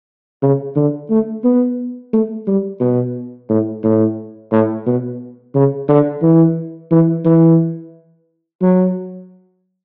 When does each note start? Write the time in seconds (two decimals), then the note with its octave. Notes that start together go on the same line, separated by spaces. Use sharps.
0.42 C#3
0.76 D3
1.10 A3
1.44 B3
2.13 A3
2.47 G3
2.80 B2
3.49 A2
3.83 A2
4.52 A2
4.86 B2
5.55 C#3
5.88 D3
6.22 E3
6.91 E3
7.25 E3
8.62 F#3